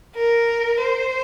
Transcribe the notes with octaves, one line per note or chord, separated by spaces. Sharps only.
A#4
C5